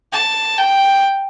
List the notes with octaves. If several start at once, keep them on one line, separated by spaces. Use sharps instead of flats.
A5
G5